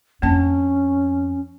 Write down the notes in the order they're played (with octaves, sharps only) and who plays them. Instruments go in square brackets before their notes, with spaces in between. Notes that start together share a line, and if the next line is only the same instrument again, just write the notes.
[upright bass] F2 D4 [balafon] A#3 A5 [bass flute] C#4